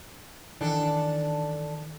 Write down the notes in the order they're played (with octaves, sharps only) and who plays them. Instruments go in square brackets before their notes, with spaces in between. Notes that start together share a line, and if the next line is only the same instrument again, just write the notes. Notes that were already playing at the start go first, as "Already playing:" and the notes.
[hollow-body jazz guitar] D#3 E3 [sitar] D4 A4